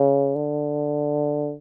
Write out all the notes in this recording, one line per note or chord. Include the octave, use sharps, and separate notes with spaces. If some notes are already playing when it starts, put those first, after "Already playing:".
Already playing: C#3
D3